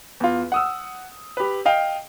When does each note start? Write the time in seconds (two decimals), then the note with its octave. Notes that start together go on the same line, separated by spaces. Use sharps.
0.20 E2 F4
0.52 F#5 D#6 E6
1.37 G4 B4
1.65 D#5 F5 G5